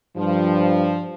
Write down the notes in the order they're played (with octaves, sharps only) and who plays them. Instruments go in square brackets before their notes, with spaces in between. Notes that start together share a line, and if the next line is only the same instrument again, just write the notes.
[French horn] G2 [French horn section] F3